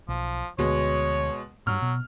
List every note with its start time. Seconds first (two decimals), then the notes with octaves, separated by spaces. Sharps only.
0.09 B1 F3
0.59 D2 B2 G#3 C#5
1.67 G2 A#2 F#3 F6
1.82 B2